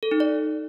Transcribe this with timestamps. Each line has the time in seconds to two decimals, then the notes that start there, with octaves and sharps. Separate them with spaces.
0.03 A4
0.11 D#4
0.20 D5